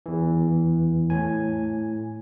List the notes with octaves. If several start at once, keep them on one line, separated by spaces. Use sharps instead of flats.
E2 E3
A2 G#5